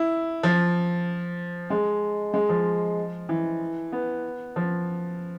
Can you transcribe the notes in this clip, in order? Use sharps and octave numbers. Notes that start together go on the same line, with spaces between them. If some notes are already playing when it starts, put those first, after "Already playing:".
Already playing: E4
F3
G#3
G#3
F3
E3
B3
F3